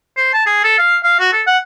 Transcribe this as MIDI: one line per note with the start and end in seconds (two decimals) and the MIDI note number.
0.16 0.33 72
0.33 0.45 81
0.46 0.63 68
0.64 0.75 69
0.78 0.97 77
1.03 1.18 77
1.19 1.28 66
1.32 1.41 69
1.47 1.58 78